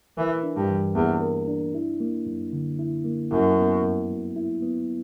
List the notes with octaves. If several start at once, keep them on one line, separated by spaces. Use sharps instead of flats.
E3 A#4
D4
G2
E3
E2 A#3
A#4
D4
E4
A#3
F#2
D3
E4
A#3
F#2 E4
B3
G2
F#3
E4
B3